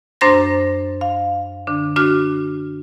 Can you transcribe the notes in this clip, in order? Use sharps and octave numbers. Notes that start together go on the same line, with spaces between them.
F#2 D4 C5 C6 A6 A#6
F5
D3 D4
D4 F#4 F6